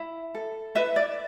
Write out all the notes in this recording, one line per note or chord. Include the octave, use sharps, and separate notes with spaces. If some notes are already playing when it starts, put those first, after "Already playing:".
Already playing: E4
A4
E4 B4 E5
D5